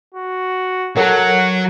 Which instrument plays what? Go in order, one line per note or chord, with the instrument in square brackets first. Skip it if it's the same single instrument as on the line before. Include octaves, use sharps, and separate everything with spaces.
[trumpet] F#4
[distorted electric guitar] F#3 [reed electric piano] A4 A#4 [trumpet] F#5